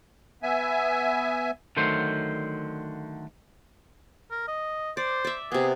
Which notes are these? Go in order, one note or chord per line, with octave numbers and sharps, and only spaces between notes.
B3 E5 G#5
D3 D#3 F#3 A3 C5
A#4
D#5
C5 D5
D5 E5
C3 B3 G#4